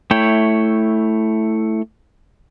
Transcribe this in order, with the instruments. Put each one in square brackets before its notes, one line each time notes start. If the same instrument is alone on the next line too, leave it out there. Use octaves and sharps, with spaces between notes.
[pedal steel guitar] A3 E4 C#5 G5